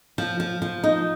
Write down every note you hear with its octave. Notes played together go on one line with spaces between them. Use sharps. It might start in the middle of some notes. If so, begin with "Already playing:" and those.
F3
F3
F3
D#4